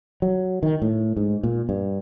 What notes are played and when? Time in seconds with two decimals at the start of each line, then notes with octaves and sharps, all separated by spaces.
0.22 F#3
0.63 D#3
0.82 A2
1.17 G#2
1.43 A#2
1.69 G2